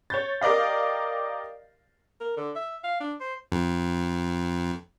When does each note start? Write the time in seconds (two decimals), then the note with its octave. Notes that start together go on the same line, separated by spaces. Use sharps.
0.10 C#5 G6 A6
0.41 G4 A#4 D5 D#5 F5
2.21 A#4
2.37 D3
2.56 E5
2.84 F5
3.01 D4
3.21 C5
3.52 F2